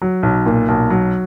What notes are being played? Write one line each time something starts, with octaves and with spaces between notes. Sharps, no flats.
F#3
B1
A#2
B1
F#3